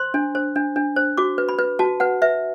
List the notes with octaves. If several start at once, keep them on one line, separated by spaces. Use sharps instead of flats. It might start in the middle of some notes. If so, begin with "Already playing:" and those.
Already playing: C5 C6
D4
C5
D4
D4
C5
F#4 D6
B4
B5
B4
F#4 A5
B4 F#5
B4 E5